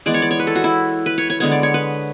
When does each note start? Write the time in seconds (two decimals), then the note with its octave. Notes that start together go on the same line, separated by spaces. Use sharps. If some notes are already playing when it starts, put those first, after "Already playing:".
0.06 E3 G#3 B3 D5
0.14 C#5
0.22 D5
0.31 C#5
0.40 B4
0.47 A4
0.55 F#4
0.64 E4
1.06 B4
1.18 C#5
1.30 C#5
1.40 D3 G#3 B3 C#5
1.52 D5
1.63 C#5
1.74 B4